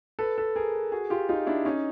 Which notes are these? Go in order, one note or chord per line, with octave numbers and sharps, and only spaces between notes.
A4 B4
A4 B4
G#4 A#4
F#4 G#4
F4 G4
D#4 F4
D4 E4
C#4 D#4